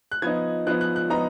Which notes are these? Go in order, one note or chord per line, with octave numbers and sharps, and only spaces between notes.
F#6
F3 B3 D#4 G#6
F3 B3 D#4 F#6
F#6
F#6
F3 B3 D#4 A#5